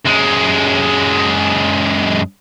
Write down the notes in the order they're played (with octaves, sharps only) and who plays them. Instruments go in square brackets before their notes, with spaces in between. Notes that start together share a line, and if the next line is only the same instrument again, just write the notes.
[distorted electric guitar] F#2 G#3